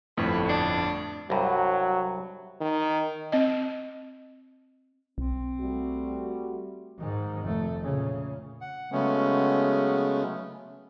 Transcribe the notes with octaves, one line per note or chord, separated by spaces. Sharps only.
G1 F2 A2 B4
D4
C2 G2 F#3
D#3
C4 D#5
B1 C4
G3 A3 F#4
G#2 D#3
F1 A3
A#2 C#3
F#5
C#3 F#3 G#3 A3 B3 C#4